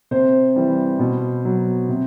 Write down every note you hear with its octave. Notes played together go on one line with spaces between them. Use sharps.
C3 C5
E3 G3
B2
F#3
C3